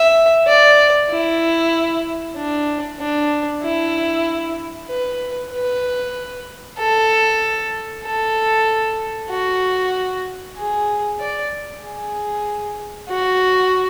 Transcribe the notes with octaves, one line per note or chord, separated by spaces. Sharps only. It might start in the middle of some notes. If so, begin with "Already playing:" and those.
Already playing: E5
D5
E4
D4
D4
E4
B4
B4
A4
A4
F#4
G#4
D5
G#4
F#4